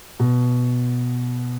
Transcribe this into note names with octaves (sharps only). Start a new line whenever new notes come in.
B2